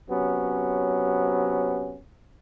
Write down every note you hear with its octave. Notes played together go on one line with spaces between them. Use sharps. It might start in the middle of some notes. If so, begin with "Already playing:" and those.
C3 F#3 B3 C#4